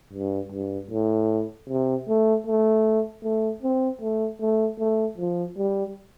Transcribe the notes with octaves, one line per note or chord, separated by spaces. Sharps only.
G2
G2
A2
C3
A3
A3
A3
C4
A3
A3
A3
F3
G3